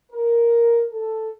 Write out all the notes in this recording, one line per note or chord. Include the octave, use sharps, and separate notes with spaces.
A#4
A4